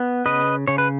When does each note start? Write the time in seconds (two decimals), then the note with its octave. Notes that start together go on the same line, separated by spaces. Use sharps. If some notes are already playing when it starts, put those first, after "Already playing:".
Already playing: B3
0.26 C#3 B4 D#5
0.68 C#3 C#5
0.78 B4